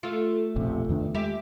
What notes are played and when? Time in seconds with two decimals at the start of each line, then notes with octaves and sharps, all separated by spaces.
0.03 A3 F4
0.56 E1 A#1 C3
0.89 E2 D#3 D4
1.14 G#3 G4 E5